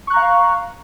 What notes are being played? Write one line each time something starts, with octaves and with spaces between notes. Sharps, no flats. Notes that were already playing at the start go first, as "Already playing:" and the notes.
F5 A#5 C#6 F#6